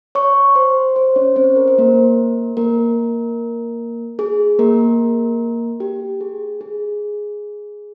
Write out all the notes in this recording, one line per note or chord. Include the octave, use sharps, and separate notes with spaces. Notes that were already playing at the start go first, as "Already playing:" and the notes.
C#5 C#6
C5 C6
C5 C6
C#4 C#5
C4 C5
A#4
C5
A#3 A#4
A#3 A#4
G#4
A#3 A#4
G4
G#4
G#4